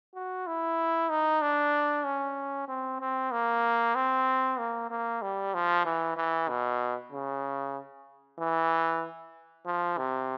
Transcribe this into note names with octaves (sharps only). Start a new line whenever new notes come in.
F#4
E4
D#4
D4
C#4
C4
C4
A#3
C4
A#3
A#3
G3
F3
E3
E3
B2
C#3
E3
F3
C3